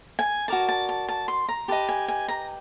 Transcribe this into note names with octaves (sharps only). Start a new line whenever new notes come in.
G#5
F#4 A#4 D5 A5
A5
A5
A5
C6
A#5
G4 B4 D#5 A5
G#5
G#5
A#5